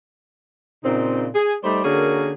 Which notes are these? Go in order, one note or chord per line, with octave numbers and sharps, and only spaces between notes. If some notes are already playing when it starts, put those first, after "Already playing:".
A#2 C#3 C4 D#4
G#4
G3 A3 D#4 C5 D5
D3 A#3 C#4 F#4 G#4 A#4